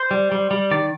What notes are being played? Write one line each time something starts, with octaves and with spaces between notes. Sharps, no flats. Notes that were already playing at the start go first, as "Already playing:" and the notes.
Already playing: C5
G3
G3
G3
D#3 D5